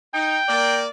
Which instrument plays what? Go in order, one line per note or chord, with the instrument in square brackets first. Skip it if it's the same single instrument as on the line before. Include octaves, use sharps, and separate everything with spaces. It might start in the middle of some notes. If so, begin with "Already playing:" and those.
[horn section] D#4 [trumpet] G5
[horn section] A#3 D5